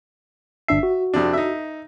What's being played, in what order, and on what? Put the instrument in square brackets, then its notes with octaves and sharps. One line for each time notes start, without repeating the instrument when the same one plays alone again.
[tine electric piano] G1 D4 C7 [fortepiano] E5
[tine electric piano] F#4
[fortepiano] F2 C3 D4
D#4 E5